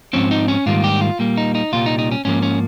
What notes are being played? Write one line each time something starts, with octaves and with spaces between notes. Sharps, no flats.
G#2 F3 C4 C#4
D#4
C#4
G#2 D#3 G3 A#3 F4
G4
F4
A#2 G3 A#3
D#4
D#4
C2 A#2 G3 F4
D#4
D#4
C#4
G#2 F3 A#3 C#4
C#4